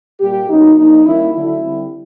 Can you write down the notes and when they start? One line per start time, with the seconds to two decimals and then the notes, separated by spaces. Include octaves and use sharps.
0.20 A#2 G3 A#3 G4
0.49 B2 F#3 A#3 C#4 D#4
0.77 F3 A#3 D4 D#4
1.06 D#3 G3 A#3 C#4 E4
1.33 D3 F#3 A3 D4 E4
1.61 D3 G3 C4